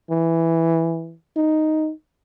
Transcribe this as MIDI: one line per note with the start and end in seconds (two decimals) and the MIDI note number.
0.11 1.15 52
1.37 1.91 63